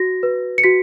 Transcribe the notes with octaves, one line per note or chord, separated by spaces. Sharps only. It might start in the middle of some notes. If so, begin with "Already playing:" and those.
Already playing: F#4 A#6
B4
C#7
F#4 B6